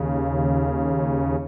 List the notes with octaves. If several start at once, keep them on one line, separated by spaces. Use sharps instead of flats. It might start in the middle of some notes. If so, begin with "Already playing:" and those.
Already playing: D#2 C#3